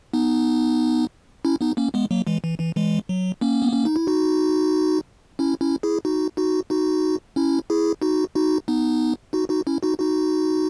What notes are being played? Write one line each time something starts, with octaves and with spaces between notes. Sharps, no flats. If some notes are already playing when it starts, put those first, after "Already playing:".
B3 D#4
C#4 E4
B3 D#4
A#3 C#4
G#3 B3
F#3 A#3
E3 G#3
E3
E3
E3 G#3
F#3
A#3 C#4
B3
C#4
D#4
E4
D#4 F#4
C#4 E4
C#4 E4
E4 G#4
D#4 F#4
D#4 F#4
D#4 F#4
C#4 E4
E4 G#4
D#4 F#4
D#4 F#4
B3 D#4
D#4 F#4
D#4 F#4
C#4 E4
D#4 F#4
D#4 F#4